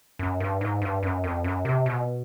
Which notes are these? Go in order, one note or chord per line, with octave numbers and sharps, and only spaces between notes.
F#2
G2
G#2
G2
F#2
F2
F#2
C3
B2